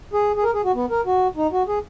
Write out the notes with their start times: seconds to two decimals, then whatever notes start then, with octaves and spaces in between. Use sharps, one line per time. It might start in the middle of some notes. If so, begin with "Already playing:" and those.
0.13 G#4
0.36 G#4
0.44 A#4
0.54 G#4
0.65 F#4
0.75 B3
0.90 A#4
1.06 F#4
1.36 D#4
1.52 F#4
1.68 G#4